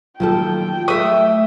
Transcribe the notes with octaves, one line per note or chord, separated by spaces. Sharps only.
D#2 F3 F#3 F4 A4 G5
A3 E5 D#6